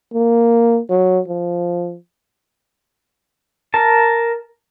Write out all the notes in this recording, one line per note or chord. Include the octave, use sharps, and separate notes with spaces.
A#3
F#3
F3
A#4 A5